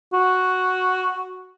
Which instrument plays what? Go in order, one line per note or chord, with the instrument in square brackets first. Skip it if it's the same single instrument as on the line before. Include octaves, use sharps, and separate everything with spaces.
[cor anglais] F#4